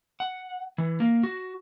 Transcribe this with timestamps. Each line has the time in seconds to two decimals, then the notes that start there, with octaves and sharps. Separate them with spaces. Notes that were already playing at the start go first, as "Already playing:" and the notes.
0.20 F#5
0.78 E3
1.00 A#3
1.23 F#4